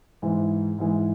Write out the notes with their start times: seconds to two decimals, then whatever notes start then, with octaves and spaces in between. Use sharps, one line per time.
0.22 G#2 E3 G#3 E4
0.79 G#2 E3 G#3 E4